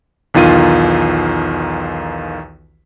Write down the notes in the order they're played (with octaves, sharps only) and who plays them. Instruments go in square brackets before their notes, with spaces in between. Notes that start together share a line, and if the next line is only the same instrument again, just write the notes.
[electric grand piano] B1 E2 D#3 F4 D#7